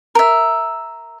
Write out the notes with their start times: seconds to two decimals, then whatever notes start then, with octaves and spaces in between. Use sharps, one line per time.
0.15 A#4 E5